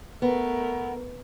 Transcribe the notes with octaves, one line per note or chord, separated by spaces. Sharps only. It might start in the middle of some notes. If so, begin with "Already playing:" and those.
A3 B3 A#4